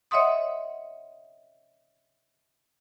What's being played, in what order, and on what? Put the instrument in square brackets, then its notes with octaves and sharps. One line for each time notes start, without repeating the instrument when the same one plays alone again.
[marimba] C#5 D#5 E5 F#5 C6 D#6